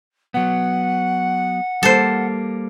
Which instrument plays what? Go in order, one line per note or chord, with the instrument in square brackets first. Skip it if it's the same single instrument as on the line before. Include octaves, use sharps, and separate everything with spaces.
[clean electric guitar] F#3 B3 [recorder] F#5
[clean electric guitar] G3 A#3 [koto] A4 C5